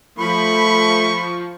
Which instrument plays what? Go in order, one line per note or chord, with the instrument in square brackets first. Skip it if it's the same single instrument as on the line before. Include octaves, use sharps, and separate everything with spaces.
[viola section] F3 [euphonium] A3 [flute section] B5 [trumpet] C#6